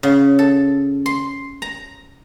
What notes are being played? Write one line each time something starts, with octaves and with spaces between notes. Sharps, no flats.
C#3
A4
C6
A#5